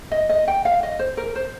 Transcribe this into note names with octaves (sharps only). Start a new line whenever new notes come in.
D#5
D#5
G5
F5
D#5
C5
A#4
C5